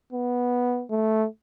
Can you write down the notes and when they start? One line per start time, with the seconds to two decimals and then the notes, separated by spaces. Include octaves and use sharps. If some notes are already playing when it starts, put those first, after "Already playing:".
0.13 B3
0.91 A3